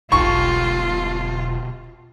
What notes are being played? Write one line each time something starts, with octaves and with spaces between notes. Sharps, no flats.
E1 B1 B2 F4 G4 A4 C#6